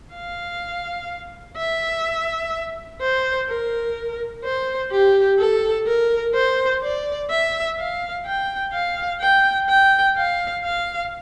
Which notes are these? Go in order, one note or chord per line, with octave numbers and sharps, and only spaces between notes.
F5
E5
C5
A#4
C5
G4
A4
A#4
C5
D5
E5
F5
G5
F5
G5
G5
F5
F5